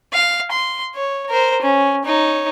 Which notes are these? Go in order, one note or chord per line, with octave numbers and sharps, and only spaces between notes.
F5
C6
C#5
A#4 C5
C#4
D#4 C#5